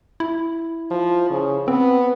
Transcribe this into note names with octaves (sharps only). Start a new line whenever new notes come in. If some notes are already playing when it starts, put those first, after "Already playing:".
E4
F3
C#3
B3 C4